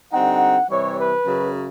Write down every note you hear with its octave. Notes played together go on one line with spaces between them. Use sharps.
D3 G3 C4 D#4 F#5
C3 E3 G3 C#5
B4
F#2 C#3 F#3